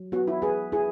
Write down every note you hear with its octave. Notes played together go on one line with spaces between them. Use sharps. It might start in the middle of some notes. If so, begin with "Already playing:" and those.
Already playing: F#3
B3 F#4
E4
G#4 B4
E4 G#4